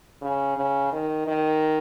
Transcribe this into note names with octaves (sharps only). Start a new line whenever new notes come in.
C#3
C#3
D#3
D#3